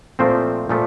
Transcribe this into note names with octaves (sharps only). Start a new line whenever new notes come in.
A#2 F3 A3 C4 C5
A#2 F3 A3